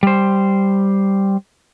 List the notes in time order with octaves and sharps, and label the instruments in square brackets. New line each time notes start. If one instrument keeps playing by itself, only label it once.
[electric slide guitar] G3 C5